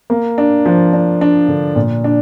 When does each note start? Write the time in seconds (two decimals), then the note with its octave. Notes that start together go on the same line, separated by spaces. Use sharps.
0.10 A#3
0.38 D4
0.66 F3
0.93 D4
1.21 D4
1.48 D3
1.76 A#2
2.04 D4